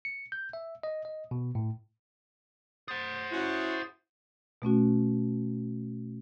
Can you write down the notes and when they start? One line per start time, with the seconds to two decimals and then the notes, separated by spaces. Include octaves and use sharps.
0.05 C#7
0.32 G6
0.53 E5
0.83 D#5
1.05 D#5
1.31 B2
1.55 A2
2.88 G#4 C5 F#5 A6
3.32 C#4 E4 F#4
4.62 B2 A3 C#4 F#4